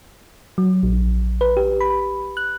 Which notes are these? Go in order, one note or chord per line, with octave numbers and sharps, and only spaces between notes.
F#3
A#1
B4
G4
B5
F#6